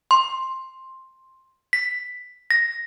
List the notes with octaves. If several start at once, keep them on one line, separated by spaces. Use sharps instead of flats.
C6
B6
A#6